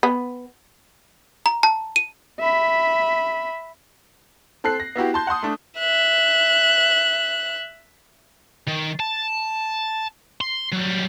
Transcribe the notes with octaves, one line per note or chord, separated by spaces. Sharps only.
B3
A#5
A5
D#7
E5 B5
C4 A4 F#6 C7
A#6
B3 E4 F#4 G4
A5 C6 G6
F#5 A5 C6 D#6
A3 D4
E5 F#6
D#3
A5
C6
F#3 G3